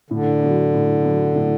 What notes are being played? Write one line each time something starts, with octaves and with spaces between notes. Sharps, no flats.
A2 D3
F#3 B3
A2
F#3 B3
A2